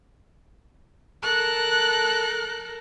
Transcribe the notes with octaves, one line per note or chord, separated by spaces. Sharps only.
A4 A#4 F#6